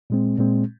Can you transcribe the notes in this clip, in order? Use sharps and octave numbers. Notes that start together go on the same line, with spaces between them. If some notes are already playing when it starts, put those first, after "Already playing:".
A#2 G#3 C4
A#2 G#3 C4